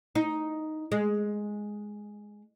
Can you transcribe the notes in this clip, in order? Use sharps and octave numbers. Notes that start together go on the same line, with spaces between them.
D#4
G#3